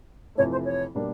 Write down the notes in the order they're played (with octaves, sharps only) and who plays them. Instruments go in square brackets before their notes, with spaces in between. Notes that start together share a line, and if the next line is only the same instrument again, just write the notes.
[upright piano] F2 C3 E3 A3 [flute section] C#5
[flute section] C5
C#5
[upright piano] B2 G3 A#3 D4